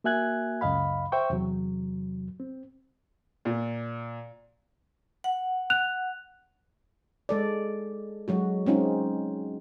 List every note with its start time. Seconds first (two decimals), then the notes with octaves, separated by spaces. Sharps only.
0.04 A#3 F#4 E5 G#5 F#6 G#6
0.61 C#2 F#2 D#5 F5 B5
1.12 C5 E5 G5 C#6
1.30 E2 C3 F#3
2.40 C4
3.45 A#2
5.24 F#5
5.70 F#6 F7
7.29 G#3 A4 D5
8.28 F#3 G#3 F#4
8.66 G#3 C4 C#4 D#4 F4